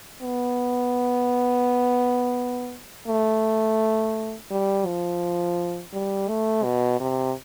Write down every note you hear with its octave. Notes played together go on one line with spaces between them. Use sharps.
B3
A3
G3
F3
G3
A3
B2
C3